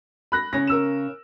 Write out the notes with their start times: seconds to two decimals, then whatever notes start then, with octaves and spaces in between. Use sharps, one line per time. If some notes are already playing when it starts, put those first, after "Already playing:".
0.32 B5 F#6 A#6
0.53 C#3 C#4 A#6
0.67 A#4 E6 E7